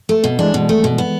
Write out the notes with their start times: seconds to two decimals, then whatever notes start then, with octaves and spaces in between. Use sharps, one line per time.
0.09 A3
0.24 B2
0.39 E3 G#3 D4
0.54 B2
0.69 A3
0.84 B2
0.98 B3